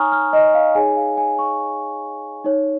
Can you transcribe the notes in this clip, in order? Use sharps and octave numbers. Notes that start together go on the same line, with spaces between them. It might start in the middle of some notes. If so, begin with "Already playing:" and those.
Already playing: D#4 C#5 G#5 A#5 C#6 D#6 F6
F6
D#5
F5
D#4 G#4 C#5 G#5
F5
G#5
C#6
D#4 C#5